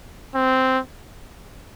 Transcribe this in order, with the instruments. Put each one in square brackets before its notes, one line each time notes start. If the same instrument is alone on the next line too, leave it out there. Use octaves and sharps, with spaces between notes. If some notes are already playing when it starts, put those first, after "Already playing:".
[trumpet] C4